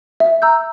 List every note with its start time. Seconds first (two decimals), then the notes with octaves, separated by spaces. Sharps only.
0.20 E5
0.42 A#5 E6 G6